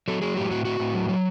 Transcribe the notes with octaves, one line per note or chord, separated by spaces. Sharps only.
F#3 A4
F#3 G#4
A2 G4
A2 F#4
A2 F#4
A2
F#3
F#3